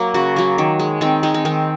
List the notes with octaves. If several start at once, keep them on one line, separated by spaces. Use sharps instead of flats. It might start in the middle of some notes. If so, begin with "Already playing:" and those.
Already playing: F#3 A#3
C#3 F#4
F#3 A#3
D#3
G#3
D#3 C4
G#3 D#4
C4
D#3 C4